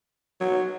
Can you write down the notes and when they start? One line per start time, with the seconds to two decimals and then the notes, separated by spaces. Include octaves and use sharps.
0.41 F#3